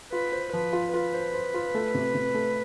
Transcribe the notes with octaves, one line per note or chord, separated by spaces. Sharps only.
F4 B4
C5
F3 B4
F4
F4 B4
C5
C5
F4
A3
C3
C3
A3